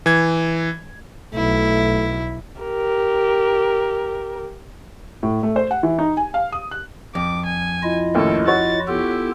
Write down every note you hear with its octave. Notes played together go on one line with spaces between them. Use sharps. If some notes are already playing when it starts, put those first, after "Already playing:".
E3 G#6
B1 A3 E4
G4 A#4
A2
A3
C5
F#5
E3
D#4
G#5
F5
D#6
F#6
F2 D6
G#5
E4 F4 D#5
D#2 A2 C#4 A4
F#4 C#5 A6
B3 E4 F4 G4 A4